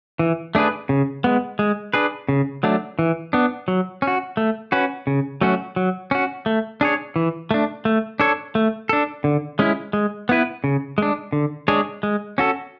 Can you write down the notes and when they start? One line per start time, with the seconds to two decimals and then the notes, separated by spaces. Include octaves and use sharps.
0.19 E3
0.55 A3 D4 G#4 B4
0.89 C#3
1.24 G#3 B3
1.59 G#3
1.94 D4 G#4 B4
2.29 C#3
2.63 F#3 A3 D4
2.99 E3
3.33 B3 D4
3.68 F#3
4.02 C#4
4.07 F#4
4.37 A3
4.72 C#4 F#4 B4
5.07 C#3
5.41 F#3 A3 C#4 F#4
5.76 F#3
6.11 C#4 F#4
6.46 A3
6.81 D4 G#4 C#5
7.16 E3
7.51 A3 D4
7.85 A3
8.20 D4 A4 C#5
8.55 A3
8.89 D4 A4
9.24 D3
9.59 G#3 C#4 E4
9.93 G#3
10.29 B3 E4 B4
10.64 C#3
10.98 G#3 D4
11.33 D3
11.68 G#3 D4 G#4 C#5
12.03 G#3
12.38 C#4 F#4 A4